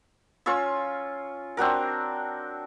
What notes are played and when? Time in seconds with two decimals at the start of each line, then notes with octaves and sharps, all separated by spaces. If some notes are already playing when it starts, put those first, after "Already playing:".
0.46 C#4 F4 C#6 E6
1.57 C4 D4 F#4 A#4